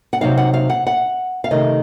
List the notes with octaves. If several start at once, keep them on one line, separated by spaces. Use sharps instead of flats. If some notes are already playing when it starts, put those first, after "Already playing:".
F#5
C3 F#3 C4 D#4 F5
F#5
F5
F#5
F#5
F5
C3 D#3 A3 D#5